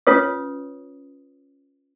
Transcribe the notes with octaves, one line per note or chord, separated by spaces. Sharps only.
C#4 F4 B4 C#5 D#6